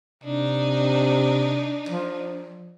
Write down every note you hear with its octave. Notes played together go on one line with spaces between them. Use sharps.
C3 D4 D#4
F3